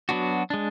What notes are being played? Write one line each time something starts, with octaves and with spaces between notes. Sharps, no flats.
F#3 B3 D4 F#4
G#3 D4